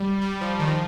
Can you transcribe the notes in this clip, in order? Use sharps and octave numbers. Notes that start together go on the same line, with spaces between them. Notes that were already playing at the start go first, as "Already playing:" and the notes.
Already playing: G3
G3
F3
D#3
F3